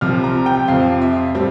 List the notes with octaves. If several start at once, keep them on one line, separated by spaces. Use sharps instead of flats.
C2 C3 F3 F6
A#5
G5
F2 C3 F3 F5
E5
A2 G3 C4